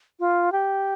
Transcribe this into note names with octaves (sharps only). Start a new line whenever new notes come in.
F4
G4